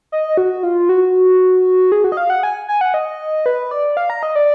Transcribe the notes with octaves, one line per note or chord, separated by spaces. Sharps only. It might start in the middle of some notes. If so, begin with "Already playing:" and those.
D#5
F#4
F4
F#4
G#4
F#4
D#5
F5
F#5
G#5
G#5
F#5
D#5
B4
D5
F5
A#5
D#5
D5